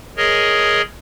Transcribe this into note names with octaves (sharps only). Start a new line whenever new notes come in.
G#4 A#4 C#5 D#5